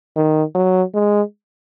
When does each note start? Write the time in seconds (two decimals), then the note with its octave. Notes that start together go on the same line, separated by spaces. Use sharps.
0.16 D#3
0.55 F#3
0.94 G#3